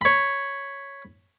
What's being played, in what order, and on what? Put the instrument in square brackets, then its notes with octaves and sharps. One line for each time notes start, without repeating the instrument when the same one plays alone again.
[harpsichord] C#5 B5